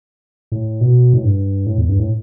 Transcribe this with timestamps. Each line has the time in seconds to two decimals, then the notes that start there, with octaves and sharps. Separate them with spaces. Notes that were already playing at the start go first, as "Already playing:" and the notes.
0.52 A2
0.81 B2
1.14 A2
1.24 G2
1.66 A2
1.78 E2
1.89 G2
1.99 A2